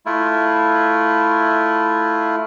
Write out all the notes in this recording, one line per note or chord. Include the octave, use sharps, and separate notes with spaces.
A3 E4 F4